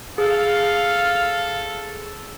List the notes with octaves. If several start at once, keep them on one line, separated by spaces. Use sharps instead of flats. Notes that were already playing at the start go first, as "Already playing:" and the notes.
G#4 A4 F5